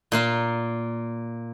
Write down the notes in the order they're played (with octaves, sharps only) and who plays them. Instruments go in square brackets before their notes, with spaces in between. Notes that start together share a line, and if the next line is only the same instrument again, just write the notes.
[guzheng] A#2 A#3 F4